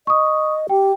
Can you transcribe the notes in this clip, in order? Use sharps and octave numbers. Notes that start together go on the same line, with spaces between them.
D#5 C#6 D#6
G4 G5